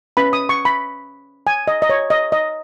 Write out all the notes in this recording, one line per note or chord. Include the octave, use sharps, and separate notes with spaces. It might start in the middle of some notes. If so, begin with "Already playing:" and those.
C#4 B4 B5
D#6
C#6
B5
G#5
D#5
D#5
C#5
D#5
D#5